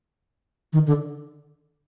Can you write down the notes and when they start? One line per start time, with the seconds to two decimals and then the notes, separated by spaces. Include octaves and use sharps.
0.73 D#3
0.87 D3